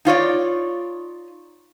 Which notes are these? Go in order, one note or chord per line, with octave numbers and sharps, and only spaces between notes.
D#4 F4 C#5 D5